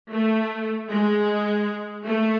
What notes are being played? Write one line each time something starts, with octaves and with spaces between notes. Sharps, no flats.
A3
G#3
A3